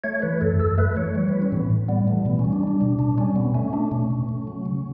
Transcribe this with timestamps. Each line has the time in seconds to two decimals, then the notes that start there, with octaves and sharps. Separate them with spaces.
0.04 A3 C#5
0.22 E3 B4
0.41 F#2 A4
0.60 F#2 A4
0.78 A3 B4
0.96 E3 C#5
1.15 G3 C#5
1.29 E3 B4
1.42 C#4
1.52 A2 B3
1.70 A2
1.88 G3 B3
2.07 E3 A3
2.25 B2 B3
2.39 C#4
2.45 G3
2.53 D4
2.63 G3 D4
2.81 B2 D4
2.99 B2 D4
3.18 G3 C#4
3.36 B2 B3
3.54 A3 C#4
3.73 A3 D4
3.92 B2 C#4
4.11 B2
4.29 A3
4.47 F#3
4.66 C#3